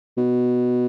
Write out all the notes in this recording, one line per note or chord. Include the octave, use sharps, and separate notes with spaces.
B2